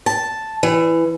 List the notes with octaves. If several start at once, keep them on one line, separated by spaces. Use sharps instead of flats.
A5
E3